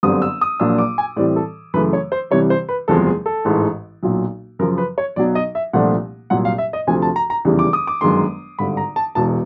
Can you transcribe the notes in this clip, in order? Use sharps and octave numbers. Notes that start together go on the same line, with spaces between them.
G1 F#2 D3 G3 C4 D#6
E6
D#6
A#1 A#2 F#3 A#3 D4 E6
D6
G#5
A2 E3 G3 C4 D5
A4
F#2 C#3 E3 A3 B4
C#5
C5
C2 C3 E3 G3 C#5
C5
B4
F#1 E2 C3 F3 G#3 A4
G#4
A4
A1 G#2 E3 G#3
B1 A#2 F#3
F#2 C#3 F3 A#4
B4
C#5
B1 B2 F#3 D5
D#5
E5
C2 A#2 F3 A3 D4 F#5
C2 A#2 F#3 F#5
F5
E5
D#5
D2 C3 F3 A3 G#5
A5
A#5
A#5
F1 E2 C#3 E3 G3
D6
D#6
D6
G1 F#2 D#3 G#3 C6
G#1 G2 D3 B5
A#5
A5
E1 E2 B2 A5